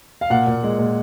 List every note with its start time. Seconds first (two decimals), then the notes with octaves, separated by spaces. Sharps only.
0.21 F5
0.30 A#2 F#5
0.47 A#2
0.63 G#3
0.79 A#2